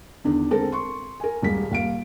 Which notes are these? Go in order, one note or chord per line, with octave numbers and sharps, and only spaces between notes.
E2 D3 D#3 D4
D3 G#3 C4 A4 A#4
C6 C#6
A#4 G#5
D#1 G3 G#3 A#3 B6
D#1 F5 D7